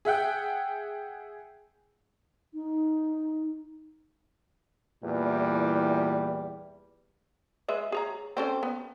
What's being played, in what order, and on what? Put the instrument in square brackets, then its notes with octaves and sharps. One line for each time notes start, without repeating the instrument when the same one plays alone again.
[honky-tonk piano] G#4 E5 F#5 G5
[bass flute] D#4
[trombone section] E2 A#2 E3 G3
[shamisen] G#3 B4 E5
G#4 C#5 A#5
C4 C#4 A4
B3